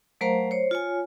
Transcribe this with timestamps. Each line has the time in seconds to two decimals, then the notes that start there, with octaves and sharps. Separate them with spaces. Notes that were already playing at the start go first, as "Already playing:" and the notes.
0.21 F#3 A3 A#4 C5 F5 A#5
0.51 C5 C#5
0.71 F4 C#5 G#5